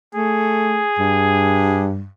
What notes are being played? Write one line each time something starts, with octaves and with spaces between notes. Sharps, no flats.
A3 G#4
G2